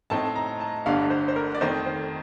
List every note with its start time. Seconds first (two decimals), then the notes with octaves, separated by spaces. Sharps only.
0.10 A2 A3 C4 D#4 A5
0.35 A#5
0.60 A5
0.86 G1 G2 D3 A3 D4 F5
1.10 C5
1.28 C5
1.36 A#4
1.55 D5
1.61 F2 D#3 A3 D#4 C5
1.86 C5